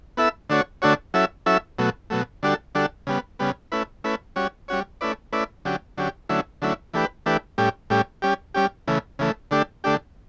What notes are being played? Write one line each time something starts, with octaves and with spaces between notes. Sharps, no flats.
B3 E4 A4 E5
D3 A3 D4 F#4 C#5
D3 A3 D4 F#4 C#5
F#3 C#4 E4 A4 E5
F#3 C#4 E4 A4 E5
B2 F#3 A3
B2 F#3 A3
D3 G3 D4 F#4 A4
D3 G3 D4 F#4 A4
C#3 G3 B3
C#3 G3 B3
A3 C#4 E4 B4
A3 C#4 E4 B4
G3 C#4 F#4 C#5
G3 C#4 F#4 C#5
A3 C#4 E4 B4 D5
A3 C#4 E4 B4 D5
D3 F#3 C#4 G4
D3 F#3 C#4 G4
D3 F#3 A3 C#4 E4
D3 F#3 A3 C#4 E4
E3 A3 D4 G4 B4
E3 A3 D4 G4 B4
A2 G3 C#4 G4
A2 G3 C#4 G4
G3 C#4 G4
G3 C#4 G4
C#3 E3 A3
C#3 E3 A3
D3 A3 D4 G4
D3 A3 D4 G4